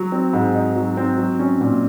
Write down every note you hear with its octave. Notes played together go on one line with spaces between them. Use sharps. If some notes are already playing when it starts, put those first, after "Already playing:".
Already playing: F#3
C4
G#2
D#4
F#3
C4
F#3
C#4
A#2